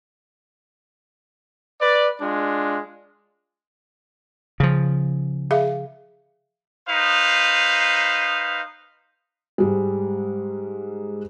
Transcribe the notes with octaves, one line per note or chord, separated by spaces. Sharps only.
B4 D5
G#3 D4 F4
C#3 F3
G#4 E5 F5
D#4 B4 C5 F5
G#2 G3 G#3